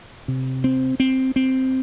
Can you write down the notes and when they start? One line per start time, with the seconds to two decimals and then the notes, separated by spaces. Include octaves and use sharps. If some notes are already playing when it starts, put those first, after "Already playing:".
0.28 C3
0.64 C4
1.00 C4
1.36 C4